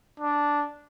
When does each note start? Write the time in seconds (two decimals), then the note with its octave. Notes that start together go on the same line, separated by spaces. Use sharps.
0.20 D4